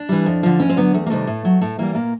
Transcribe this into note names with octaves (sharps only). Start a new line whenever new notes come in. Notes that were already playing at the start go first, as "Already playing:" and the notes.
Already playing: D4
E3 G3
F2
D3 F3
F2 C#4
C4
D3 F#3 B3
E2 A3
A#3
C3 D#3 G3 A3
A2
F#3
A2 A3
E3 G3 A#3
A#2 A#3